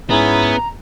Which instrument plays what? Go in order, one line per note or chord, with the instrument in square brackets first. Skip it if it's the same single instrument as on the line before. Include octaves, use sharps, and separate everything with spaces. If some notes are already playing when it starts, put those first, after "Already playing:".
[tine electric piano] G#2 [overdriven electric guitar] B3 [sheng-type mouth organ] C#4 E4 G#4 [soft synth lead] A#5